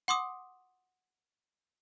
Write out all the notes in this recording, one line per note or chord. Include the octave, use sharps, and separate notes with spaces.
F#5 C6 D6 D#6